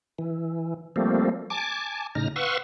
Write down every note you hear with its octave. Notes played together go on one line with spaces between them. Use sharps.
E3
F3 G3 A3 A#3 C4
G#5 A5 D6
A2 C#3 D#4 F6 A#6
B4 F5 F#5 C6 C#6 E6